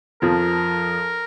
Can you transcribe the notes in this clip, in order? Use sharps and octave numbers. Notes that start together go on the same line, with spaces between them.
F2 F3 A#4